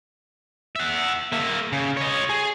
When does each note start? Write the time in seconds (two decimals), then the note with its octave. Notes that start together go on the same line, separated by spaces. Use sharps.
0.76 E5 F#5
1.32 A#3 E5
1.72 C#3
1.97 C#5 D#5
2.29 G#4